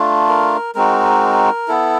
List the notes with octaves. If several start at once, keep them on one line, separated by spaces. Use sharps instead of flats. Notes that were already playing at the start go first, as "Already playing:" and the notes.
Already playing: A3 D4 F4
A#4
G#3 C4 D#4 F#4 A#4
B3 E4 A4